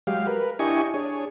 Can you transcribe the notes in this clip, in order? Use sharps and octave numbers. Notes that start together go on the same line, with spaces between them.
F#3 G#3 G4 F5
A#4 B4
D4 E4 G4 D#5 G#5 C#6
D4 G#4 C#5